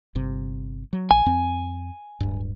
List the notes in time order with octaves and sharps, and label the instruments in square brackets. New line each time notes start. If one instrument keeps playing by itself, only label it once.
[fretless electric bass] G1 C3
F#3
[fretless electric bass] A#1 [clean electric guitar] G#5
[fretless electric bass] F2 C4
D1 G2